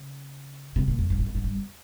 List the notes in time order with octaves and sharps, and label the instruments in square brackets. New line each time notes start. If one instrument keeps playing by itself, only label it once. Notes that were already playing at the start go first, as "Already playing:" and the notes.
Already playing: [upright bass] C#3
C3
A#2
F2
G2
G#2
A#2
G#2
G2
F2